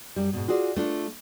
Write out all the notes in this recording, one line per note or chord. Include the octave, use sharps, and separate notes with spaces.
F#2 G3
G#2 B2
F4 F#4 G#4 D5
A3 D4 F4